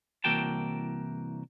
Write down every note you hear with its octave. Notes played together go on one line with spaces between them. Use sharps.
C2 E3 A#3 F#4 G5 A5